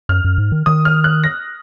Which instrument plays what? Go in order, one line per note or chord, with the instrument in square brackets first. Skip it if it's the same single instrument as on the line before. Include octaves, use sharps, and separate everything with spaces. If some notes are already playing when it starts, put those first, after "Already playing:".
[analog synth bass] F#2 [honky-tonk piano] F6
[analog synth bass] F#2
G#2
D#3
[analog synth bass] D#3 [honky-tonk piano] D#6
[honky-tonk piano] F6
F#6
A#6